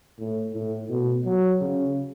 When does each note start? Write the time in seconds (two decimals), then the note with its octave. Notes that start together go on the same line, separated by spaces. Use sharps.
0.19 A2
0.54 A2
0.89 B2
1.25 F#3
1.61 C#3